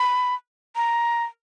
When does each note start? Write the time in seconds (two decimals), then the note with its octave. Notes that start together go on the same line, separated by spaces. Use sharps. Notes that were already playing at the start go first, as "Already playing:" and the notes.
Already playing: B5
0.76 A#5